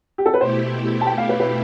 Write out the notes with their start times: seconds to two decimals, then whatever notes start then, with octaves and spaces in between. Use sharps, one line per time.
0.18 G4
0.26 A4
0.34 B4
0.41 B2 A3 E4 G4 C5
1.01 A5
1.06 G5
1.18 F5
1.29 B4
1.40 B4